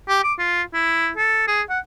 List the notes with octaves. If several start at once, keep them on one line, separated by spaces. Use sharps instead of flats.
G4
D6
F4
E4
A4
G#4
F#5